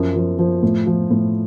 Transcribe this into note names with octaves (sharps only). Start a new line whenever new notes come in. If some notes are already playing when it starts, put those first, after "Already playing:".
Already playing: F#2 F3
F3
F3
A2
F3
A2